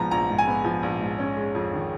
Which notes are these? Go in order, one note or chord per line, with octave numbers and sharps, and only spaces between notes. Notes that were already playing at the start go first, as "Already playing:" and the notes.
Already playing: A#1 G#2 F3 B3 A#5
A#1 A#5
G#2
G#5
B3
F3
A#1
G#2
C#4
G#3
F2
D#3